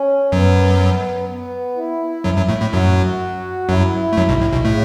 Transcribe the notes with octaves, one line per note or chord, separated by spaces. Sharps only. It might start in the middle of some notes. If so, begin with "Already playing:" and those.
Already playing: C#4
F#2 F#3 B3
B3
E4
F#2 F#3
F#2 F#3
A2 A3
A2 A3
F#2 F#3 F#4
F#2 F#3 E4
A3
F#2 F#3
B1 B2
A2
B1 B2
A2 C#3 A3